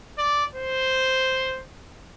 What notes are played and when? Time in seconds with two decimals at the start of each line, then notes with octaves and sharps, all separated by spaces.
0.18 D5
0.55 C5